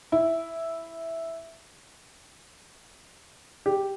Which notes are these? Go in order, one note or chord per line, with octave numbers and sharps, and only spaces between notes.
E4
G4